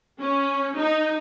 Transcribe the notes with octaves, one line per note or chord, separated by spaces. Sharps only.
C#4
D#4